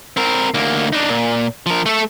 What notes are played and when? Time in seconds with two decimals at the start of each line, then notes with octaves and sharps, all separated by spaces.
0.17 C4 A#4
0.54 D2 A#3
0.93 D4 D#4
1.09 A#2
1.66 F3 A#4
1.86 A3 A4